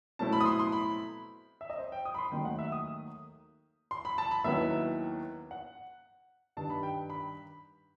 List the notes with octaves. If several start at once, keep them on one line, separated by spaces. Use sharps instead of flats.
B2 F#3 A3 C4 E4 A5
B5
D#6
C6
C6
B5
E5
D#5
C5
G5
D#6
B5
C6
D#2 D#3 F#3 A3 G5
F#5
E5
D#6
C6
B5
A5
B5
D#2 D#3 F#3 B3 E4 E5
F#5
G2 D#3 G3 A5
B5
G5
B5